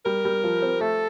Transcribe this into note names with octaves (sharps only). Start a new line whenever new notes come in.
G3 A#4
G3
F3
C4
A3 A4